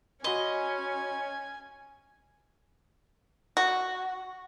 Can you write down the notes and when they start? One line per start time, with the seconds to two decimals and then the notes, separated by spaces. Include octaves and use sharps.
0.24 C#4 F#4 D#5 G#5 B5 C6
3.57 F#4